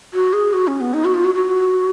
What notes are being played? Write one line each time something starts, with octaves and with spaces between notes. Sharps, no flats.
F#4
G#4
F#4
C#4
B3
D#4
F#4
F4
F#4
F#4